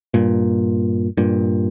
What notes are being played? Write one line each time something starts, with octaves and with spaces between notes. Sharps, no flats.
G2 A#2
G2 A#2